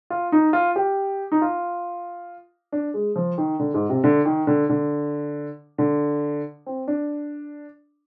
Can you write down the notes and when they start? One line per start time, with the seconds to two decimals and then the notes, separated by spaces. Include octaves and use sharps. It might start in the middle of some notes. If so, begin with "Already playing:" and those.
0.10 F4
0.32 D#4
0.53 F4
0.76 G4
1.32 D#4
1.42 F4
2.72 D4
2.94 G#3
3.16 F3
3.38 D#3
3.59 D3
3.74 G#2
3.89 C3
4.04 D3
4.25 D#3
4.47 D3
4.69 D3
5.78 D3
6.66 C4
6.88 D4